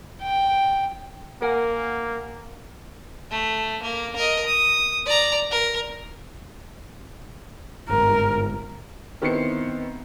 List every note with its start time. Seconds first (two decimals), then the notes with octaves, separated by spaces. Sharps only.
0.22 G5
1.42 A#3 A#4 F#5 G#5
3.31 A3
3.83 A#3
4.16 A#4 D#5
4.46 D#6
5.06 D5 A#5
5.51 A#4
7.89 G1 G#2 A#4
9.22 D#3 B3 C4 E4 C7 C#7